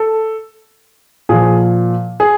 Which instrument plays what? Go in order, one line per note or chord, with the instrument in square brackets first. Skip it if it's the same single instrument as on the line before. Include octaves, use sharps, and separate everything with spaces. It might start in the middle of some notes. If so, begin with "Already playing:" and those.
Already playing: [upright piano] A4
A#2 F3 G#4
G#4